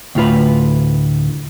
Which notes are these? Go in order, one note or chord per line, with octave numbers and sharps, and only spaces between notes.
D2 A2 F4 B4